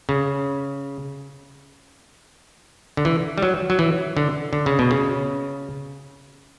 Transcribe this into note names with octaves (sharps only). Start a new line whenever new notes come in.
C#3
D3
E3
G3
F#3
F#3
E3
D3
D3
C#3
B2
C#3